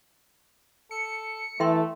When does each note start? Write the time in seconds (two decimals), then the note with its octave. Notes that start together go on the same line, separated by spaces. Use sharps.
0.91 A4 C#7
1.60 E3 A3 A4 E5 G5 C6